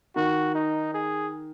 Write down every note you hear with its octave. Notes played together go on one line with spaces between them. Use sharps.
D#3 F#4
D#4
G#4